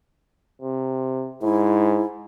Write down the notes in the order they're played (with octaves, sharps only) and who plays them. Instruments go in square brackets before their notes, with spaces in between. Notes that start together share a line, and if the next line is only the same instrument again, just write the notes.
[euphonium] C3
[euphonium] G#2 [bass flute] E4